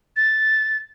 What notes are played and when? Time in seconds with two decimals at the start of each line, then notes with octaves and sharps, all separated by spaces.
0.17 A6